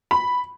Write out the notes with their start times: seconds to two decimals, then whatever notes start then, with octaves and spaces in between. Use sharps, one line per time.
0.11 B5